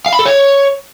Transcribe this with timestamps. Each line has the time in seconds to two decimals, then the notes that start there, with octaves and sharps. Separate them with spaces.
0.06 F5
0.13 B5
0.19 A4
0.25 C#5